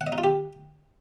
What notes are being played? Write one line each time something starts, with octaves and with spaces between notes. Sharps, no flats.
F#5
D#5
D#4
F4
G4